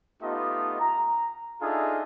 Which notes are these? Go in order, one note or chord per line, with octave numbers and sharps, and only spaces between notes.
A3 B3 D#4 F4 G4 D#5
A#5
D4 D#4 F4 G#4 A4 E5